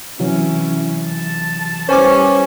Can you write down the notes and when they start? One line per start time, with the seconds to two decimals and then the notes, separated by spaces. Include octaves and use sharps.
0.20 C3 E3 F#3 C#4 E4
1.07 A5
1.89 G3 C#4 E4 G4 B4 C5 G#5 D6